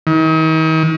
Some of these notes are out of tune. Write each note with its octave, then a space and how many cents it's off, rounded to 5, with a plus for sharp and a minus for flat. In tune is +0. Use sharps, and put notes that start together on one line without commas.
D#3 +40